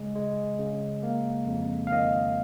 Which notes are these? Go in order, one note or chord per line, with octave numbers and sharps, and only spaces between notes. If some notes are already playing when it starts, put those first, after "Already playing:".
Already playing: C#3 G#3
G#3
C#3
A#3
F2
F5
D#3 D#5